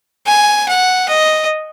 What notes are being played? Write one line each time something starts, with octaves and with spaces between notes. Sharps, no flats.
G#5
F#5
D#5